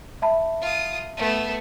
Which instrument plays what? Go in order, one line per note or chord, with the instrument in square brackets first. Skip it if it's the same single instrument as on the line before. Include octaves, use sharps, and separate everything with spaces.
[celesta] E5 A5 B5
[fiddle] F4 D#6
A3 B3